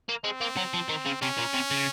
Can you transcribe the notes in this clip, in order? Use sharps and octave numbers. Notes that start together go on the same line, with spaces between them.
A#3
G#3 C4
A#3
F#3
F3
D#3
C#3
C3 C#4
A#2
C3
C#3